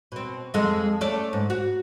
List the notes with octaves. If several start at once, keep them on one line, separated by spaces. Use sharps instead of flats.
B2 C4
F2 G#3 A4
A3 C#4 D5
G#2
F#4